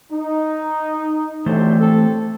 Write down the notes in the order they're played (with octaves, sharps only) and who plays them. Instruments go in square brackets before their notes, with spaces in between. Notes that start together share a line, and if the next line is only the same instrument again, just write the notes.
[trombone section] D#4
[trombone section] D2 A2 C3 [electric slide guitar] E3 A3 C5
[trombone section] C4 A4